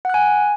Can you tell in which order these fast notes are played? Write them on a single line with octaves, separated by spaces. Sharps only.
F#5 F#6 G#5